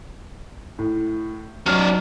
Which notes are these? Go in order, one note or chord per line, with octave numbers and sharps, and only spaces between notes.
A2
F#3 C#4 D5 F6